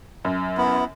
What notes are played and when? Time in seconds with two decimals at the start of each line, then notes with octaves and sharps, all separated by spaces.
0.25 F#2
0.57 B3 E4